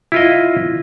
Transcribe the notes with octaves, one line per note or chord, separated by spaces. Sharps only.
E4 F4 D#5